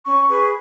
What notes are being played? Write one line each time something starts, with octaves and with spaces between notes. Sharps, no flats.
C#4 C#6
G#4 B4